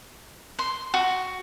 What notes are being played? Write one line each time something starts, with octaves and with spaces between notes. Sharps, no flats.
C6
F#4